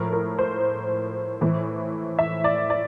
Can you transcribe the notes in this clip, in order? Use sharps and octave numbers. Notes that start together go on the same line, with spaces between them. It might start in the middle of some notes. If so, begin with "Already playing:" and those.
Already playing: A2 F3 A#4
A#4
C5
A2 E3
E5
D5
D5